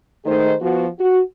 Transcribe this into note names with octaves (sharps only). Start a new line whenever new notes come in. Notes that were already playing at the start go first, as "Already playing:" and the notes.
D#3 A3 D#4 G#4 C5
F3 B3 F#4
F#4